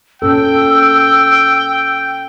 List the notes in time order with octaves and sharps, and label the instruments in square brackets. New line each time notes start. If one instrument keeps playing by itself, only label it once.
[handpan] A#2 C#4 A4 [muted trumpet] G5 [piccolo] E6